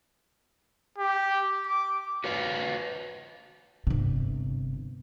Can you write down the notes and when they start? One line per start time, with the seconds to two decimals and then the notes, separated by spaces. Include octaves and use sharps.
0.98 G4
1.67 D6
2.24 F#4 B4 C#5 F5
3.87 G1 C3